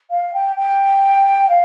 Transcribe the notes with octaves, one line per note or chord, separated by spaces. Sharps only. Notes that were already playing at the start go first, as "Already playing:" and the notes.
F5
G5
G5
F5